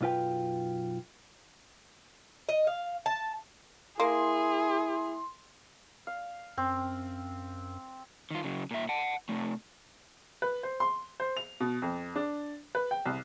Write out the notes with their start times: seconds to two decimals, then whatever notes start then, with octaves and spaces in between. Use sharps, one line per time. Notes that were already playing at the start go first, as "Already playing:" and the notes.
0.01 B1 F#2 F4 B4 G5
2.49 D#5
2.67 F5
3.06 A5
4.00 A#3 E4 G#4 C6
6.07 F5
6.58 F#2 C4
8.31 D#3 F4
8.44 C#3 F#3
8.71 A#2 E5
8.89 F#5 A5
9.29 C3 A3
10.42 B4
10.63 C5
10.80 C6
11.20 C5
11.37 F7
11.60 B2
11.82 F2
12.16 D4
12.75 B4
12.91 G5
13.05 C2